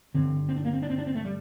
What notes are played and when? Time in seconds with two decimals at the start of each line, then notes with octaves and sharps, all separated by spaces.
0.14 G2 D3 C4
0.48 C4
0.56 D4
0.64 A#3
0.73 C4
0.82 D4
0.90 C4
0.98 D4
1.07 C4
1.15 A3
1.24 G3